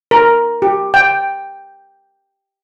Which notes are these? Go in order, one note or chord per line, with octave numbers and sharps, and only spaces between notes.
A#4
G4
G5